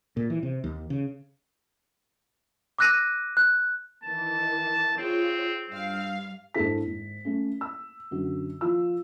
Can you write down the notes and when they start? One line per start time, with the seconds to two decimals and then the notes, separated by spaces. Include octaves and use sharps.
0.17 A#2
0.30 E3
0.43 C3
0.64 D#2
0.90 C#3
2.79 D6 E6 F#6 A#6 D#7
3.37 F#6
4.03 D#3 E3 A5
4.98 C4 F4 G#4 C#5
5.68 G2 C4 F5
6.54 G#1 D4 E4 A4 B6
6.86 G#1
7.25 A3 C#4
7.61 E6
8.11 F#2 D3 F#4
8.61 F3 F4 E6